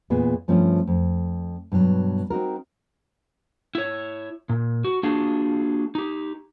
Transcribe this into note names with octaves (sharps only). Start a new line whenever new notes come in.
E2 A#2 G#3 B3 G#4
G2 F3 A3 C4 C#4
F2
G2 B2 D#3 F#3
C4 D#4 F#4 A#4
E4 C#5
A#2
F#4
A#3 D4 F4 F#4 G#4
D#4 G4